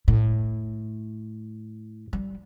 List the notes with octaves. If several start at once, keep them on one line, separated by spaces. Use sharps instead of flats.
A2
G3